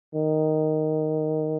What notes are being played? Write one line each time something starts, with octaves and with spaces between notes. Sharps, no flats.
D#3